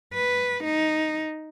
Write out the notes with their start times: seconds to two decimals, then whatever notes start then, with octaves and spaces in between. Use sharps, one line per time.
0.14 B4
0.64 D#4